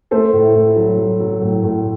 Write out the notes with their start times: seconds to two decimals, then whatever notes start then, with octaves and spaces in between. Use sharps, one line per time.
0.11 A3 A4 C5
0.33 A2
0.41 E4
0.54 A2
0.69 E4
0.76 F#3
0.98 F#3
1.20 F#3
1.42 A2
1.63 A2